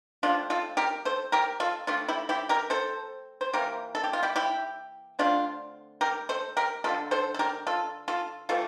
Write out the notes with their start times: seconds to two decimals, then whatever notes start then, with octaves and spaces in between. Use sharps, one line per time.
0.23 F3 A3 C4 D4 F4
0.50 F4 A4
0.77 G4 A#4
1.05 A4 C5
1.32 G4 A#4
1.60 F4 A4
1.87 F3 A3 C4 D4 F4
2.08 E4 G4
2.29 E4 G4
2.49 G4 A#4
2.70 A4 C5
3.41 C5
3.53 C3 E3 A#3 G4 A#4
3.95 A4
4.04 G4
4.13 F4
4.23 E4 G4
4.36 E4 G4
5.19 D3 A3 C4 D4 F4
6.01 G4 A#4
6.29 A4 C5
6.57 G4 A#4
6.84 D3 G3 A#3 F4 A4
7.11 A4 C5
7.34 A4
7.39 G4 A#4
7.67 F4 A4
8.08 F4 A4
8.49 E3 A3 C4 F4 A4